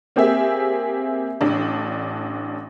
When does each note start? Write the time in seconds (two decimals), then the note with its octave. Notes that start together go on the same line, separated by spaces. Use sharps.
0.16 A#3 C4 G4 G#4 E5
1.41 A1 D4